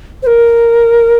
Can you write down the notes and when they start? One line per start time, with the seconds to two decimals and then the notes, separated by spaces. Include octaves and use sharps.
0.22 C5
0.26 A#4